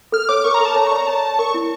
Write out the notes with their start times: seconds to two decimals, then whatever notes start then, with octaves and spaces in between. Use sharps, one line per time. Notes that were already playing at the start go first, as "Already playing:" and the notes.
0.12 A4 F6
0.29 C#5 D6
0.44 A#4 C#6
0.54 A#5
0.60 A4
0.65 A5
0.76 C#5 A#5
0.87 C#6
0.92 D5
0.96 A#5
1.07 C#5 A5
1.39 A#4 C#6
1.54 E4